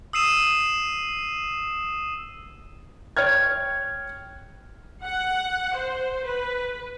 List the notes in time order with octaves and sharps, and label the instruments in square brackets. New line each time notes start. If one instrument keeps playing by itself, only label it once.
[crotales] D#6 E6 C7 D#7 E7
[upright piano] C#5 G5 F6 G#6
[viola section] F#5
C5
B4